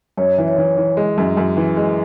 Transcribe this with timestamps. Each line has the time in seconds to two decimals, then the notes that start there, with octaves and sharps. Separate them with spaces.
0.17 F#2 C#5
0.37 E3 E5
0.48 C#5
0.58 E3
0.77 E3
0.97 G#3
1.18 F#2
1.37 F#2
1.57 E3
1.77 G#3